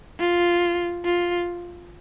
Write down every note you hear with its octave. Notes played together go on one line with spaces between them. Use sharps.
F4
F4